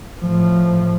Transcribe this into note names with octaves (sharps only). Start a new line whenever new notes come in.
A2 F3